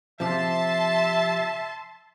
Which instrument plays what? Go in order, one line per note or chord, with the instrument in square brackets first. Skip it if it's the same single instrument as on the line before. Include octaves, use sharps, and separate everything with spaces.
[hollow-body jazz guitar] C3 F3 [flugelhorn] E5 [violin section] A5 C6